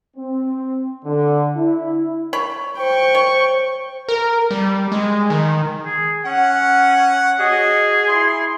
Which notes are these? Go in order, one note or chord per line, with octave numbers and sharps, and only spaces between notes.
C4
D3
E4
C#5 B5
C5 G5 C#6
C#5
A#4
G3
G#3
D#3
G#4
C#4 F#5
F#4 G#4 C#5 D#5
E4 C6